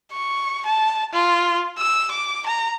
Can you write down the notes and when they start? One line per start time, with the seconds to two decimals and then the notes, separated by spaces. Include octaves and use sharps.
0.11 C#6
0.66 A5
1.13 F4
1.78 E6
2.11 D6
2.46 A#5